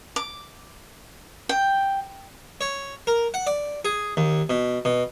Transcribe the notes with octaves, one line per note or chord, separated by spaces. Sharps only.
D6
G5
C#5
A#4
F#5
D5
G#4
D#2
B2
B2